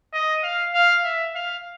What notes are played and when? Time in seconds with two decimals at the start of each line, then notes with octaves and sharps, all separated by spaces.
0.13 D#5
0.44 F5
0.74 F5
1.04 E5
1.35 F5